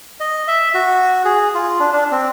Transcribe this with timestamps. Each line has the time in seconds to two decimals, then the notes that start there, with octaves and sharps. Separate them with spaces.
0.20 D#5
0.48 E5
0.74 F#4
1.25 G#4
1.54 F4
1.80 D4
1.93 D4
2.11 C4